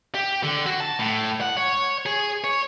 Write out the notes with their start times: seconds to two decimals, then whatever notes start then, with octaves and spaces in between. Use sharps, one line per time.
0.15 G4
0.43 D3
0.66 F#4
0.80 A5
0.99 A2
1.41 F#5
1.57 C#5
2.06 G#4
2.44 C#5